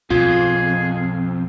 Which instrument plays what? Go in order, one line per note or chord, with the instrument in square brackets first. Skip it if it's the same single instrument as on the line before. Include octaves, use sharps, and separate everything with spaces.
[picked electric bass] B1 B2 [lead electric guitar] F2 [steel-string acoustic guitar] F4 [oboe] G#4